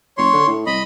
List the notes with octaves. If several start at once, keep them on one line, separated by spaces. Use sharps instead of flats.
F#1 C#5 C6
D3
A2
C2 D#5 B5